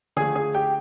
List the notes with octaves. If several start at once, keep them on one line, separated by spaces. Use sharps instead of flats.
D3 F3 A3 G#4 G#5
G#4 G#5
G4 G5